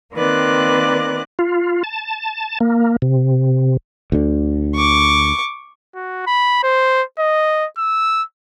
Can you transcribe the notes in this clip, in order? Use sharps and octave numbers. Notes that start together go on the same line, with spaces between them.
D#3 A#3 C4 B4 D5 F#6
F4
A5
A#3
C3
D2 D3
C#6 D6
F#4
B5
C5
D#5
E6